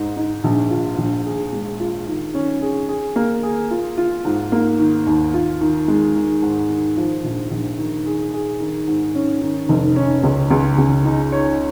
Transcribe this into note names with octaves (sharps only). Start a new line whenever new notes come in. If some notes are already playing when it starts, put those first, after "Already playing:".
Already playing: G#2 D#4
D#4
A#1
F4
A#1
G#4
G#3
F4
D#3
C#4
G#4
G#4
A#3
G#4
F4
F4
G#2
A#3
D#3
D#2
F4
D#3
G#3
D#3
G#2
D#3
F3
A#1
A#1
D#3
G#4
G#4
D#3
G#2
C#4
D#3
F1
C#4
C#2
C#2
C#2
D#4
C#5